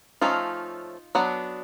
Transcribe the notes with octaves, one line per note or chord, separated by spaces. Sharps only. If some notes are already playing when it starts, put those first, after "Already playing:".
F3 A3 C#4 D#4 F4
F#3 B3 D4